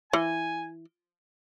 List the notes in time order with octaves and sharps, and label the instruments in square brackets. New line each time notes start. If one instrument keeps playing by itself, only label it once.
[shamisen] E3 [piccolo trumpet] G#5